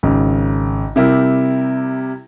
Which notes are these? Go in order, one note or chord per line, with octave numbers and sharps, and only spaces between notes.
G#1 C#3
C3 G3 E4 G4 A#4